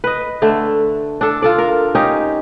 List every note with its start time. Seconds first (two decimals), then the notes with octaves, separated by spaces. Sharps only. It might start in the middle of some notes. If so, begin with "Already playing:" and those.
0.04 B4 D#5
0.42 D3 A3 E5
1.21 D4 A4
1.42 F4 A4 D5
1.58 A#4
1.95 C#4 D#4 G4